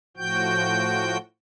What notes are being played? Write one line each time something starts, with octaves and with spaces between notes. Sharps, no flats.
A2 F3 F#4 G5 G6